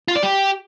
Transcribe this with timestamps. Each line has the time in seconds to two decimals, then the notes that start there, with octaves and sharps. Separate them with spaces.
0.08 F4
0.16 D5
0.23 G4